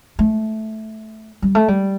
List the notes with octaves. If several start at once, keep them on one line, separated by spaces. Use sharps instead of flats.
A3
G3
A3
G3